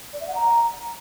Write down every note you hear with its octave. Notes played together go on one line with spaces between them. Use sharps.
D5
E5
F#5
A#5